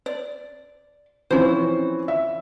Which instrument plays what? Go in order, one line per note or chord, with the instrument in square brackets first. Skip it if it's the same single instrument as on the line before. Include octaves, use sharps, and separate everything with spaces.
[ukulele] D5
[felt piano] E3 F3 C4 [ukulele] C#4 C5
[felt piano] E5